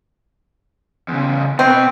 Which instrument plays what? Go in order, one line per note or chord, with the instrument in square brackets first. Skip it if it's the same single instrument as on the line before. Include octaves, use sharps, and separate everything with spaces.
[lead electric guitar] E2 C#3
[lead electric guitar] B2 [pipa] C4